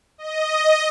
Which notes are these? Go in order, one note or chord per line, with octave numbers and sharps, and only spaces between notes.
D#5